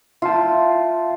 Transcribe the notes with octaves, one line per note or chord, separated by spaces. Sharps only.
F4 E5 F5 A5